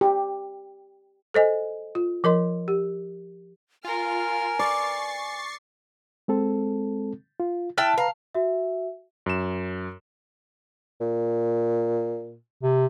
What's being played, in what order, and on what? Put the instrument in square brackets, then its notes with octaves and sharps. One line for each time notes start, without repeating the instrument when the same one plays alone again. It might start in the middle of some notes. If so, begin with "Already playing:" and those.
[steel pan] G4
[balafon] A4 C5 D#5 G#5
F4
F3 A#4 D#5 C6
G4
[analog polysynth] F4 [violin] A#4 F6 [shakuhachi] G#5
[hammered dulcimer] D5 [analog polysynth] C#6 A6 C7
[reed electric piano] G#3 C4 A4
F4
[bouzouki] E4 G5 A5 [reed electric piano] F6 F#6
[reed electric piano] B4 A#5 [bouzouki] F5
[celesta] F#4 E5
[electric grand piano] F#2 E7
[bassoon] A#2
[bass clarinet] C3